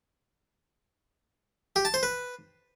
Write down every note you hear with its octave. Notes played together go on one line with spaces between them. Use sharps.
G4
A5
C5
B4